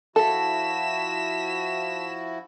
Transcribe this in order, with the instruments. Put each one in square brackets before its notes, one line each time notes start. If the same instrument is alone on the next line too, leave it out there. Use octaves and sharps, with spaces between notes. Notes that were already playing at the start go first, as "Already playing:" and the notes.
[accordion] F3 E4 F#4 [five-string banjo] A4 [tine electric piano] A5 [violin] B6 E7